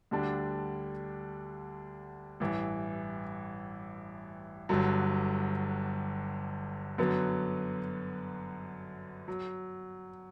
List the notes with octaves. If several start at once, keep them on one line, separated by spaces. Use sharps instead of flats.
D2 D3 G3 D4
A1 G2 E3
G1 G2 D3 F#3
F#2 D3 F#3 B3
F#3